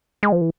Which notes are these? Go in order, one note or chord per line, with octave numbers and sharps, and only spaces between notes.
G#3
F3
E3